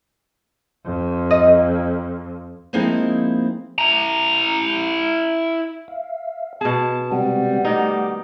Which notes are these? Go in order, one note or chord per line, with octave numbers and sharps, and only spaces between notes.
F2
D#5
F3 G#3 A#3 C4 D#4 E4
E4 A#5
E5 F5
B2 B3 G#4 A5
C3 G3 G#3 C4 F#5
D#3 A3 D#4 D6